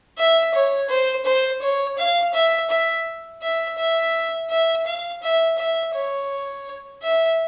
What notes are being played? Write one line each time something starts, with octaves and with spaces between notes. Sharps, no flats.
E5
C#5
C5
C5
C#5
F5
E5
E5
E5
E5
E5
F5
E5
E5
C#5
E5